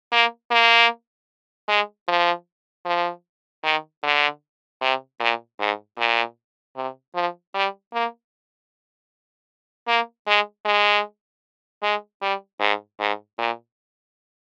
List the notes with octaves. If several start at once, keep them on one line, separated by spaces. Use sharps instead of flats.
A#3
A#3
G#3
F3
F3
D#3
D3
C3
A#2
G#2
A#2
C3
F3
G3
A#3
A#3
G#3
G#3
G#3
G3
G#2
G#2
A#2